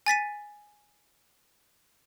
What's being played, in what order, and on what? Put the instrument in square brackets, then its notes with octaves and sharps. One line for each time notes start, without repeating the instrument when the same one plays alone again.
[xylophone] G#5 A6 B6 D#7